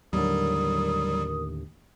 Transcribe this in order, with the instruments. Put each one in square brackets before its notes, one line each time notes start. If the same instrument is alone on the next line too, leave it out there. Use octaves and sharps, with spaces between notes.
[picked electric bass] D#2 A2 D3 [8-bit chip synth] F#3 G3 [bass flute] A#4 [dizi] D#6